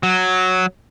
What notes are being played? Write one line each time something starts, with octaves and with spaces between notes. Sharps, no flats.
F#3